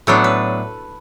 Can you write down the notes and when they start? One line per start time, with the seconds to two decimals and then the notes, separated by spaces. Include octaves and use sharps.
0.07 A2 F#3 B3 D4 A4
0.24 B4